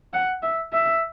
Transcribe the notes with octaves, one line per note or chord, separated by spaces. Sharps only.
F#5
E5
E5